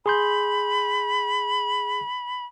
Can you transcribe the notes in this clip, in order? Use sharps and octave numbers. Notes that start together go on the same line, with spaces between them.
G#4 B5 C6 G6